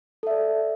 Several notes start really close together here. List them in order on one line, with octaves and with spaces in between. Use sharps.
A4 E5 D5